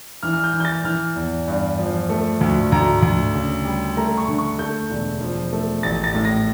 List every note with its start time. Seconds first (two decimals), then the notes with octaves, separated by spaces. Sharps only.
0.23 E3 F6
0.33 F6
0.44 G6
0.54 E3
0.60 G6
0.65 A6
0.84 E3 F6
1.16 E2
1.48 G2
1.79 F3
2.09 A3
2.41 D2
2.72 D2 A#5
3.03 D2
3.35 C#3
3.65 G3
3.97 A3 A#5
4.18 C#6
4.28 D3
4.38 C#6
4.59 A3 G6
4.91 E1
5.21 F3
5.53 A3
5.83 A1 A6
6.04 A6
6.15 A2
6.25 A#6